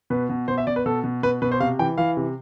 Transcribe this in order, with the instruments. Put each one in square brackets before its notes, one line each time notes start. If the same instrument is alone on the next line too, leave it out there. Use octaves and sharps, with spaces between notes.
[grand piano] B2 B4
B2
B2 C5
E5
B2 D5
B4
B2 A4
B2
B2 B4
B2 B4
C5
C3 F5
E3 G5
E3 F5
C3